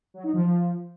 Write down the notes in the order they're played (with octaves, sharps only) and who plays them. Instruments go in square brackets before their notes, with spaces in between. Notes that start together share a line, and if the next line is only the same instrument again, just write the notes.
[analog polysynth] F#3
D#4
F3